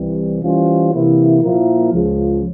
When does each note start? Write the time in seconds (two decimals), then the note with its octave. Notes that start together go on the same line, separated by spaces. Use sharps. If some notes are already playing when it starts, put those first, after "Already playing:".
Already playing: C2 C3 E3 G3
0.43 E3 G3 C#4 F4 C5
0.93 C3 E3 A#3 E4
1.42 A#2 F3 A#3 E4 A#4
1.92 C#2 C#3 F3